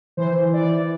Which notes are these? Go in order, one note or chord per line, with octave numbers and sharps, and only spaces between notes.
E3 C5
E3
E3 D5
E3